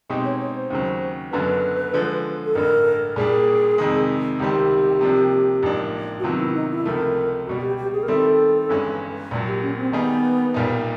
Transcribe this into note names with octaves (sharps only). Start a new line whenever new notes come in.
B2 G#3 C4 D#4 G4
C#5
C#5
C5
D#2 C#3 F#3
F#1 F#2 D3 F#3 B3 B4
D3 F3 G#3
A4
A1 G2 D3 A#4
A#2 G3 A#3 D4 G#4
F2 C3 D#3 G#3
C#2 C3 D#3 G3 C4 G4
C3 F3 A#3 D4
A1 G#2 F3 A#3 D4
F#4
C3 D#3 F#3 B3 F4
E4
D#4
E4
C#2 C3 F3 A3 A#4
C#2 B2 G3 F#4
G4
G4
G#4
A#4
D#3 G3 C4 E4 A4
G1 G2 E3 G#3 C#4
A#1 A#2 F#3
G4
C#4
C4
D#3 G3 A#3 B3 D#4 G#4
B1 A#2 G3 A#3 D#4